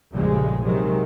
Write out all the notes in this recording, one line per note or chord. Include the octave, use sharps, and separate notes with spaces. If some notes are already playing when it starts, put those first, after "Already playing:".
A#1 F2 C#3 F3 G3 G#3
C3 D#3 F#3 G#3